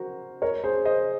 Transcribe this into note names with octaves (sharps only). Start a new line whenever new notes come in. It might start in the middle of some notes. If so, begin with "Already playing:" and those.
Already playing: F#4 A#4 C5
A#4 C#5
G#4 C5
C5 D#5